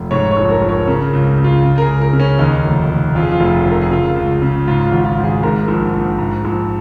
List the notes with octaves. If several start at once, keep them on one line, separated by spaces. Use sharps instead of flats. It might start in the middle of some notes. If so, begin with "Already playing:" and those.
Already playing: F1
G#2 C#5
C#5
A#1
A#4
A#1
C#5
C#3 A#4
C#2
C#3
F4
C#3
A#4
G#4
C#2
A#4
C#3
C#4
D#2 D#4
F1
F1
F2 F4
G#4
F4
F1
F1
A#4
G#4
C#3 F4
C#2
C#3
G#2 F4
F4
G#1
F4
G#1
G#4
G#2 A#4
A#1
A#1
G#2
A#1